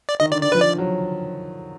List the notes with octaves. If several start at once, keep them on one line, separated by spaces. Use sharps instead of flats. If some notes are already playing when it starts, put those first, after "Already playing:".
D5
D#3 D#5
D3 D5
D#3 D5
F3 B4
D5
F#3